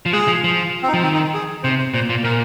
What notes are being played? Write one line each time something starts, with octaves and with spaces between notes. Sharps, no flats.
F3
G#3 G#4
F3
F3
C4
D#4
F3
D#3 C4
D#4
G#4
C3 C5
C5
A#2 C5
A#2
A#2 A#4